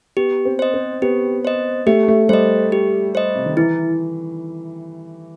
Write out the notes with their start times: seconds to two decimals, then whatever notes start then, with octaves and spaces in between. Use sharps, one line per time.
0.17 B3 G4
0.45 C4
0.59 C5 D#5
0.74 C4
1.02 B3 G4
1.45 C5 D#5
1.87 A3 G4
2.08 A3
2.29 G3 C5 D#5
2.72 G4
3.15 C5 D#5
3.36 C3
3.46 D#3
3.57 E3 E4